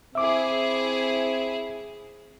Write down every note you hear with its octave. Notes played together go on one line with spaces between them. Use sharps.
C4 E4 G#4 E5 D6